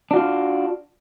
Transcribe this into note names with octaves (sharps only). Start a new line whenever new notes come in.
D4 F4 F#4